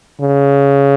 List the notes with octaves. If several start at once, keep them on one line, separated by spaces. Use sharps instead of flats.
C#3